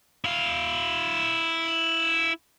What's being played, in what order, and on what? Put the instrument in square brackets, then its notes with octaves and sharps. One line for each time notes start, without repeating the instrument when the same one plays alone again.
[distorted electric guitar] E4 F5